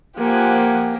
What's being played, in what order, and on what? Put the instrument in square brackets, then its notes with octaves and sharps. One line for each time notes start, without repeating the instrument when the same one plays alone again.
[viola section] F3 F#5 G#5 [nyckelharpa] A#3 G4